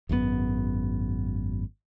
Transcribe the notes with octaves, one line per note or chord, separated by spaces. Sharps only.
G#1 F#2 B2 B3